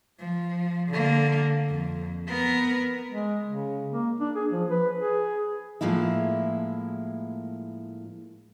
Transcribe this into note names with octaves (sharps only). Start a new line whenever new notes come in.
F3
D3 A#3
F2
B3 A#4
G#3
C#3
A#3
D4
G#4
F3
B4
G#4
A2 F3 G#3 A#3 E4